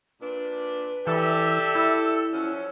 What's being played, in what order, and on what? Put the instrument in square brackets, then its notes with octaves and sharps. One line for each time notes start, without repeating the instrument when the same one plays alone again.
[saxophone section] A#2 D4 [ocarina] B4
[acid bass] E3 [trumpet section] G4 D5 E5 [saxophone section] A4
[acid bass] E4 [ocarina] E6
[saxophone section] F3 F#3 C#4